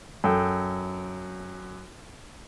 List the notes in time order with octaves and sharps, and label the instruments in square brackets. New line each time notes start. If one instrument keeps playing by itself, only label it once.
[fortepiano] F#2 A4 G5